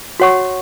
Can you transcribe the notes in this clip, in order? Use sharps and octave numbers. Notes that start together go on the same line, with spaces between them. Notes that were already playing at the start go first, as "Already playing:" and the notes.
F#4 C#5 F#5 C#6